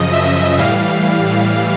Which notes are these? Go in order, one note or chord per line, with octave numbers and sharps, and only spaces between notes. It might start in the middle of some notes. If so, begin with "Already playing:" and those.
Already playing: F#2 C#3 F3 D#5
E5
A2 E3 G3 F5